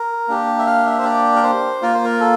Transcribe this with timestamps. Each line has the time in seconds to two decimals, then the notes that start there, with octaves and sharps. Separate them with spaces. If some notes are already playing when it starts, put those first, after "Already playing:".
Already playing: A#4
0.28 A#3 D4 G4
0.59 E5
0.66 F5
0.86 E5
0.98 C5
1.05 D5
1.36 A#4
1.43 C5
1.82 A#3 F4 A#4
1.94 C5
2.05 A#4
2.20 A4